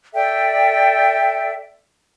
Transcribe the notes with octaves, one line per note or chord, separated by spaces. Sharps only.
A4 D5 E5 G5